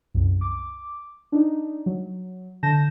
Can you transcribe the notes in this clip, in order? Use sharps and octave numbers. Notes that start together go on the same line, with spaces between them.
C2 F#2
D6
D4 D#4
F#3
D3 A5 G6 A#6 E7